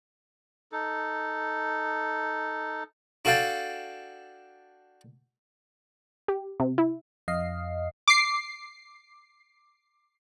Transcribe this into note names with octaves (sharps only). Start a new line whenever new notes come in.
D#4 A4
D4 F#4 A4 F5 G5 A5
G4
C3
E4
F2 D#5 F5 C7
D6 C7